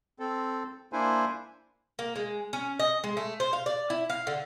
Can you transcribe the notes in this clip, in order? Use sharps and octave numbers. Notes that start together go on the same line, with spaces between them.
C4 A4
A#3 D4 E4 C5 G#5
A#3
G#3
C#4
D#5
G#3
A3
C5
F5
D5
E4
F5
D3